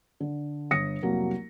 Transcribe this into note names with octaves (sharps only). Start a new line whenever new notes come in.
D3
G1 D#6 A#6 C#7
F1 C2 F#3 A#3 A#4